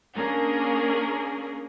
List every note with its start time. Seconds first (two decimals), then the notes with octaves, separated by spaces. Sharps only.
0.16 A#3 C#4 D4 G#4 A#4